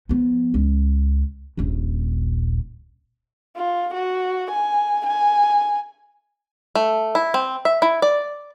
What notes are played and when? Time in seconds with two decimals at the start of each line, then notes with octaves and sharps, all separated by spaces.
0.09 F3 B3
0.54 C#2
1.57 D#1 A#1
3.57 F4
3.94 F#4
4.51 G#5
5.06 G#5
6.75 A3
7.15 E4
7.34 C4
7.65 E5
7.82 E4
8.02 D5